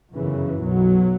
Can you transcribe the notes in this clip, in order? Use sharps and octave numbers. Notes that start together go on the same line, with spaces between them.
G1 F#2 C#3 E3
B1 B2 F#3